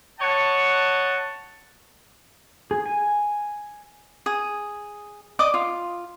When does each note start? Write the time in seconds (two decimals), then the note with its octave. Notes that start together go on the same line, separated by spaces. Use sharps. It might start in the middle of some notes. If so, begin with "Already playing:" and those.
0.20 C#5 D#5 F#5 A5
2.71 G#4
2.86 G#5
4.26 G#4 D#6
5.39 D5 D#5 D6 D#6
5.54 F4